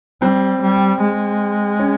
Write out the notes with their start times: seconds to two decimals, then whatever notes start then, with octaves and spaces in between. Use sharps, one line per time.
0.22 G3 C4
0.61 G3
1.01 G#3
1.79 C#4